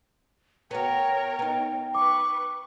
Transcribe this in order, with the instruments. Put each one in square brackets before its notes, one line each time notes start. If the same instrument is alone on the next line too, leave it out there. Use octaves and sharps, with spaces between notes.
[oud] B3 F#4 [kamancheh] A#4 C#5 [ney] G5
[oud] B3 D#4
[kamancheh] B4 C#6 [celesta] D6